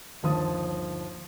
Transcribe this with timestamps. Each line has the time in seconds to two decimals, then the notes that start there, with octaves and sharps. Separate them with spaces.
0.23 G1 D#2 F3 A5 D#6